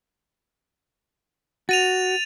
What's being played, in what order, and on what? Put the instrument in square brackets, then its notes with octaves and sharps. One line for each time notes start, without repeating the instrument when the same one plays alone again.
[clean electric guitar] F#4 [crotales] A6 D#7 F7